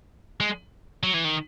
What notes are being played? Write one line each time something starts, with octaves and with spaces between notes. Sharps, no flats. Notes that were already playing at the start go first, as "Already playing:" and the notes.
G#3
F#3
E3
D#3